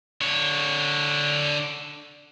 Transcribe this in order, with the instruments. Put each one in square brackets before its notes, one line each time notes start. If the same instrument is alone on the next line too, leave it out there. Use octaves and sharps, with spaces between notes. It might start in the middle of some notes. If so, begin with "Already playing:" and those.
[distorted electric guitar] D3 C#5